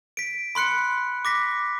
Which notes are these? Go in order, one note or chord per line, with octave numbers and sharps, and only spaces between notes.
B6 D7
B5 C6 F#6 C#7
D6 A#6 B6